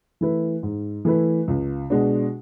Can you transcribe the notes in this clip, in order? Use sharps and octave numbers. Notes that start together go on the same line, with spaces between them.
E3 A3 E4 B4
G#2
E3 A3 E4 B4
C#2
B2 G#3 D4 F#4